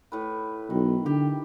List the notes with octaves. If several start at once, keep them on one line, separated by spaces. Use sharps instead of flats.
A2 B4
B1 D#3
D3 G4